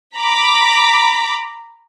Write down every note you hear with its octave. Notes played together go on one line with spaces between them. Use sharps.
A#5 B5 D6 B6